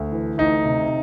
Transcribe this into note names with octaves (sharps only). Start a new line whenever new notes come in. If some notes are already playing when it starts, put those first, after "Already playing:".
Already playing: D2
E3
D2 D#4
C3